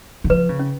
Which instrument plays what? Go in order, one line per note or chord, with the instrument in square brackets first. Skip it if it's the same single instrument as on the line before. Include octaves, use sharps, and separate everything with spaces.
[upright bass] D3
[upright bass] F3 [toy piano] B4
[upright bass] C#3
[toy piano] C#4